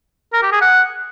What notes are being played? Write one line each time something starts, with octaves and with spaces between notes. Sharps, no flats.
A#4
G4
G#4
F#5